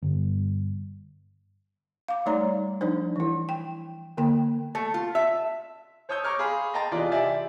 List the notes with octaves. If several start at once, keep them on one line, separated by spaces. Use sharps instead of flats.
G1
F5 D6
G3 A3 D#4 C#5 D5 A#5
F3 D4 D#4 C5
E3 E4
G5
D3 A#3 G5
A3
F4
E5
C5 C#5 A5 D#6 E6 G6
A#5 C#6 D6 F6 G#6
G#4 F5 B5 C6
D#5 G5 A5 A#5 C6 A6
C2 E3 F4 G#4 D5
G4 D5 E5 G#5